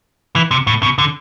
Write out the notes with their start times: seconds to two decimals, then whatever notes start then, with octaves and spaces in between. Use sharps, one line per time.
0.36 E3
0.51 C3
0.67 A2
0.83 B2
0.98 D3